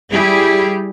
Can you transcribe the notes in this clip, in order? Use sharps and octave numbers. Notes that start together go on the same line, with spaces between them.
G3 E4 G4 G#4